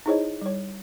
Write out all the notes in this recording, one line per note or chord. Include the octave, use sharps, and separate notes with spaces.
D#4 E4 G#4 C5 C#5 D#5
G3 C#5